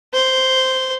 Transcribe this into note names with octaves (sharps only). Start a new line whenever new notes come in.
C5